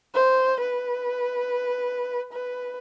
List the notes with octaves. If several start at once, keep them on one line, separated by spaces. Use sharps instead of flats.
C5
B4
B4